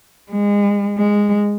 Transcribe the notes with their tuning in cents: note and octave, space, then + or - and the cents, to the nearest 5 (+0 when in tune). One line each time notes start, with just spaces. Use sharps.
G#3 -30
G#3 -10